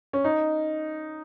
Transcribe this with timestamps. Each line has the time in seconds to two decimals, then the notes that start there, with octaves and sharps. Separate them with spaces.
0.13 C#4
0.24 D#4